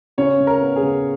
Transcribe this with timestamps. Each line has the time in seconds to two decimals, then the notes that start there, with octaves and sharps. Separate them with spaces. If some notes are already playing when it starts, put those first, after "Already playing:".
0.18 C#3 C#4 C#5
0.40 C#3
0.47 A#4
0.61 B3
0.76 G#4
0.83 C#3